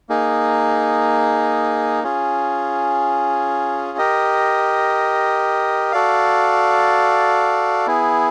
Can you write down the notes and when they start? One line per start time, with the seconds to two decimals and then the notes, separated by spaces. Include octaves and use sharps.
0.09 A#3 D#4 G#4
2.04 C#4 F4 G#4
3.98 G4 A#4 D#5
5.92 F#4 A4 D5 F5
7.87 B3 E4 G#4